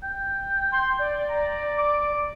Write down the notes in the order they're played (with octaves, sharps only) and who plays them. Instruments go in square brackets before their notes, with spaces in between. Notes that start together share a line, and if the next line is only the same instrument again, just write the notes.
[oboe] G5
[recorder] C6
D5
[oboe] A#5
D6